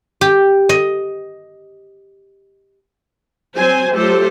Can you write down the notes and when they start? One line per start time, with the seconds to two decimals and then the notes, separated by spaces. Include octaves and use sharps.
0.21 G4
0.69 D#5
3.56 F#3 C4 C5 G#5
3.96 F#3 A3 F4 G4 A4 C5